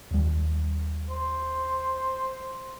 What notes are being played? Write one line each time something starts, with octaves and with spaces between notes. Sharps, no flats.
D#2 G3
C5